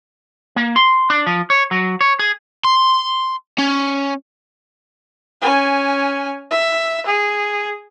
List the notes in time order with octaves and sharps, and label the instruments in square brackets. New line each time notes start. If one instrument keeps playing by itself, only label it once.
[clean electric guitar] A#3
C6
D4
F3
C#5
F#3
C#5
G#4
[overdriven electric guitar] C6
C#4
[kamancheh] C#4 G#5
E5
G#4